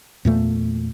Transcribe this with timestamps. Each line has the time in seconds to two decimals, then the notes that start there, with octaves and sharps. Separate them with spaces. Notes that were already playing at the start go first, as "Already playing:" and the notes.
0.25 E2 A#2 A3